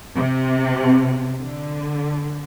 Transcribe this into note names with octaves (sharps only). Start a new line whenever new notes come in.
C3
D3